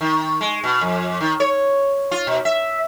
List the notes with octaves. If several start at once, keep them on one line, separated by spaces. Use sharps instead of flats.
D#3
G#3
B2
F2
D#3
C#5
F4
B2
E5